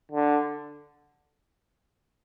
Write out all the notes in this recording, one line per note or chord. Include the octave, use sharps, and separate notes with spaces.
D3